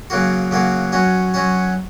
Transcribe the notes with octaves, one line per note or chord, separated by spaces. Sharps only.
C#3 F#3 A#3 F#4
C#3 F#3 A#3 F#4
F#3 C#4 F#4
F#3 C#4 F#4